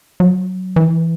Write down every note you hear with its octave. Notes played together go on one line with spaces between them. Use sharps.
F#3
E3